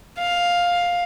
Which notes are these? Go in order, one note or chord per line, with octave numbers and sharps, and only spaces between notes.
F5